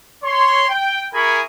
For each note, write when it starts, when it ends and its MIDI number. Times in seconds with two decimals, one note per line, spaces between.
0.23 0.66 73
0.23 0.66 84
0.69 1.04 79
1.13 1.41 64
1.13 1.41 68
1.13 1.41 70
1.13 1.41 80
1.13 1.41 83
1.13 1.41 85